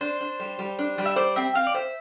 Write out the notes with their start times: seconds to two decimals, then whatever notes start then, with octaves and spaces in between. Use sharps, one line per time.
0.01 D4 C5
0.21 D4
0.40 G3
0.59 G3
0.79 D4
0.98 G3
1.06 E5
1.16 C5 D5
1.36 C4 E5
1.55 C4 F5
1.67 D5
1.74 C5 E5